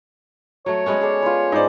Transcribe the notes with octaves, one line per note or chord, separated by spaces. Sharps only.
F#3 A3 C#5
G#3 B3 C#4
G#4 A4 D5
F4 B4
G#2 D#4 C5 D5